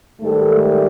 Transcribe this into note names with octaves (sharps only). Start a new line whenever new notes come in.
G#2 D#3 G3 A3 A4
A3 A4